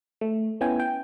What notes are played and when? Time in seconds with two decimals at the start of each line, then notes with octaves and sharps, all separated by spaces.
0.21 A3
0.61 B3 C#4 E4 G5 G#5
0.80 G5